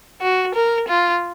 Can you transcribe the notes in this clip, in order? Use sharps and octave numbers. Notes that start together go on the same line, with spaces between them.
F#4
A#4
F4